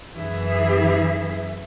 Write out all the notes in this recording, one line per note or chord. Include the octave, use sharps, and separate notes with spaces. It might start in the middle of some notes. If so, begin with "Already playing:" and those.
F#2 E3 G#4 E5